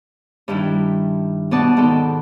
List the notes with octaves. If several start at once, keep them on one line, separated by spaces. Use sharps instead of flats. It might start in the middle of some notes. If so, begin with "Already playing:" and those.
G2 D#3 G3 E4
B2 B3 D5 F#5 A5
G#2 D#3 B3 A4